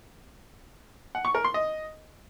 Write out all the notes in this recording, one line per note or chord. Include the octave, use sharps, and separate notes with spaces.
F#5
C#6
A#4
C6
D#5